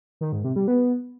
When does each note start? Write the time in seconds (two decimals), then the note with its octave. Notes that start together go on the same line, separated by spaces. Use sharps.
0.21 D#3
0.32 G#2
0.44 C3
0.56 G3
0.68 B3